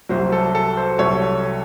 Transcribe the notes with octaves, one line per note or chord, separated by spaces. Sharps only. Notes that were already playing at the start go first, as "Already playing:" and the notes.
C2 C3 F#3 C5
A4
A4
C5
C2 C3 F#3 A4 C#5